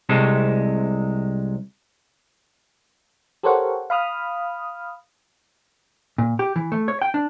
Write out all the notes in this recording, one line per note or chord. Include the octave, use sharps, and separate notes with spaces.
C2 C3 G#3 A4
G4 A4 A#4 C5 C#5 F#5
F5 B5 D#6 F6
A#2
G4
E3
A3
C#5
G5
D4